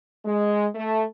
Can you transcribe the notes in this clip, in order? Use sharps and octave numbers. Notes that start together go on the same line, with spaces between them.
G#3
A3